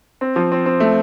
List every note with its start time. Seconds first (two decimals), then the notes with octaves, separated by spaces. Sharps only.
0.21 C4
0.36 F3
0.52 C4
0.66 C4
0.80 A3